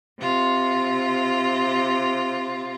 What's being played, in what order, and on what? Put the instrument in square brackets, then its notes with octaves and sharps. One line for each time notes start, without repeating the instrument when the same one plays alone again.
[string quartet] C3 F4